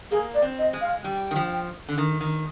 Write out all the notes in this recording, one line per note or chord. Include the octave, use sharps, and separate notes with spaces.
A#3 G#4
D5
C4
D#5
G#3
F5
G3 G5
D#3
F3
D3
D#3
D#3